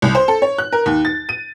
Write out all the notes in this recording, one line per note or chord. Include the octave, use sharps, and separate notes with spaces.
C2
C5
A4
C#5
F#6
A#4
D#2
A6
D#7